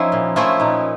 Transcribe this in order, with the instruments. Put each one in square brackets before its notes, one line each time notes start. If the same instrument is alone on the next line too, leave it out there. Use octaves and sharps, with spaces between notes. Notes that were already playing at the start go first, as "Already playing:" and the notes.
Already playing: [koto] F3 C#4 E4 [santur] D#4
[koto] A#2
F3 A3 C#4 E4
[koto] A#2 [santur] D#4